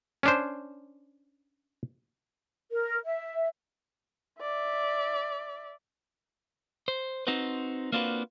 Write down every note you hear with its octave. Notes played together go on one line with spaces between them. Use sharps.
C#4 D4 C5
A#4
E5
D5 E5
C5
C4 D#4 F#4 B4 C5
A#3 C4 D4 F4 F#4 B4